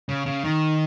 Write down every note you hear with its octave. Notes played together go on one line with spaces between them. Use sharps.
C#3
C#3
D#3